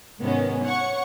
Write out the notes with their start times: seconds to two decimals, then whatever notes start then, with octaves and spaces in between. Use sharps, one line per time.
0.20 G#2 C3 D#3 B3 C#4
0.65 C#5 F#5 C#6